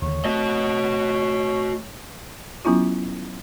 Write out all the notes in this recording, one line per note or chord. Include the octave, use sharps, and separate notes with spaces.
D#2 D3 C#5
A3 C4 F#4 D#5
F#3 B3 C#4 E4 F4